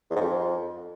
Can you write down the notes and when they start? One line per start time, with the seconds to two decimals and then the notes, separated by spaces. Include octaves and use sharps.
0.11 E2
0.16 G#2
0.21 F2